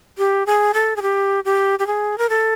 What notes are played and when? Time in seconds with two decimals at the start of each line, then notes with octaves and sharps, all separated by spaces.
0.18 G4
0.47 G#4
0.74 A4
0.96 G#4
1.02 G4
1.45 G4
1.79 G4
1.87 G#4
2.18 A#4
2.30 A4